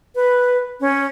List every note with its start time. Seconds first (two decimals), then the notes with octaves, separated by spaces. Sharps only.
0.15 B4
0.80 C#4